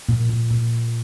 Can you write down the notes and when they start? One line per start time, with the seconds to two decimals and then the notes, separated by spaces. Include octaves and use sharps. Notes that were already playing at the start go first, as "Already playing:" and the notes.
0.09 A#2
0.29 A#2
0.51 A#2